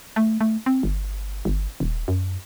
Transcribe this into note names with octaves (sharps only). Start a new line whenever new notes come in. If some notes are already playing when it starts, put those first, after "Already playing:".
A3
A3
C4
G1
G1
D#1
F#2